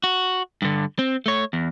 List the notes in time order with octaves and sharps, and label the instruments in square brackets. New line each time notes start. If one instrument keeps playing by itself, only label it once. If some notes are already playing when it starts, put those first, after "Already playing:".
[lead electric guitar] F#4
G2 D3
C4
A3 C#5
E2